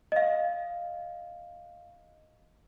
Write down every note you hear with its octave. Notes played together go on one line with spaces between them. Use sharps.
D#5 F5